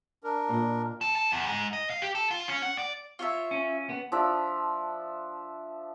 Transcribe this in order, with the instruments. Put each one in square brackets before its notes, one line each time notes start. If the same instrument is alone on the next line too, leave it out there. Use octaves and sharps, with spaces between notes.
[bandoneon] D4 A#4
[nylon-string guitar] A#2 D#5
[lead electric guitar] A4
A4
E2
G#2
D#5
F5
G4
A4
F4
C#4
F#5
D5
[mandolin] F4 C#5 E5
[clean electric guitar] C#4
B3
[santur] F3 D4 E5